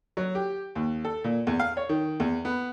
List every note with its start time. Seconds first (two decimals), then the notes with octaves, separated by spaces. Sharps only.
0.17 F#3
0.35 G4
0.75 D#2
1.04 A4
1.24 A#2
1.47 E2
1.60 F5
1.77 C#5
1.89 D#3
2.20 E2
2.45 B3